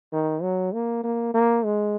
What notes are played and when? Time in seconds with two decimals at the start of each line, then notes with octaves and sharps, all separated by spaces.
0.13 D#3
0.43 F#3
0.73 A#3
1.04 A#3
1.34 A#3
1.65 G#3